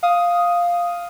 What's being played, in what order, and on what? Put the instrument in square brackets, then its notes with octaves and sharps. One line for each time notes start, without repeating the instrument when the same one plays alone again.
[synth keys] F5 D#6